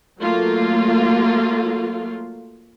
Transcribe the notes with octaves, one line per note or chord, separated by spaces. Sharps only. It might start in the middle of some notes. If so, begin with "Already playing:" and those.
F#3 A3 A#3 F4